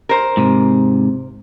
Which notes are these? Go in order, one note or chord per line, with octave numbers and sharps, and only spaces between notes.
A#4 C5
G#2 C3